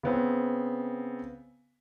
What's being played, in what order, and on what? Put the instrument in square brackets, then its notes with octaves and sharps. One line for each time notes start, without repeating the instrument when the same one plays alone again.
[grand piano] C#3 B3 C4